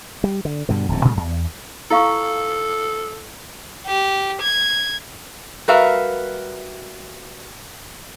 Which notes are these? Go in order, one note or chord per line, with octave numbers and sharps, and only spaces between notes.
G3
D3
G2 B2 D3
D1 F2 G#2 B2
A2 C#3 G3 A3
E2
E4 A4 F5 C#6
G4
G#6
G3 F#4 A#4 B4 E5 F5